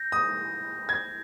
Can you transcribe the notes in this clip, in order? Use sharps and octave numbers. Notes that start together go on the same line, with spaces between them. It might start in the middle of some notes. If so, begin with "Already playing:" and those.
Already playing: G6 A#6
D#6
G#6